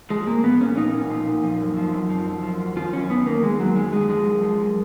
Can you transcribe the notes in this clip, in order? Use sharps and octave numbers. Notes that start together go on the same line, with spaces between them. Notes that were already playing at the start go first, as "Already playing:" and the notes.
F3 G#3
A#2 A#3
F3 B3
A#2 C#4
F3 D#4
A#2
F3
A#2
F3
F#2
F3
F#2
F3
F#2
F3
F#2
D#3 F4
F#2 C#4
D#3 B3
F#2 A#3
D#3 G#3
F#2 F#3
D#3 G#3
F#2 G#3
F3 G#3
F#2
F3
F#2